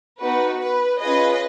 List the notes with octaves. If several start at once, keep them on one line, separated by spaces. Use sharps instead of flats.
B3 D#4 F#4 B4
B4
C#4 F4 G#4 B4 D#5